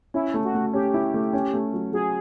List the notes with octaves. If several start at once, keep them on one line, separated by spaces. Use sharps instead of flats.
C#4 E4
A3
F#4
A3
C#4 G4
E4
A3
C#4
A3
F#3
F#3 G#4